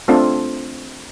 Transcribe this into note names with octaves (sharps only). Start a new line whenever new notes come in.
A3 C4 D4 F4 A4